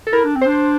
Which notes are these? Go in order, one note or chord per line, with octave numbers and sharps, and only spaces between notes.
A4
E4 A#4
D4
C4
C5
D4